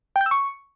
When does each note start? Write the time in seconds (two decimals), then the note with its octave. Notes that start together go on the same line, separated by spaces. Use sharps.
0.16 G5
0.21 G6
0.26 E6
0.31 C#6